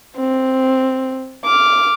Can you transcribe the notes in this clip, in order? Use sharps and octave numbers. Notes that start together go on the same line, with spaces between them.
C4
D6 F6